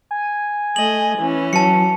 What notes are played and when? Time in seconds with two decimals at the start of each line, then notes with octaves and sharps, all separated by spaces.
0.11 G#5
0.76 A3 D#5 F#7
1.18 E3 C#4
1.53 F#3 A5 C#7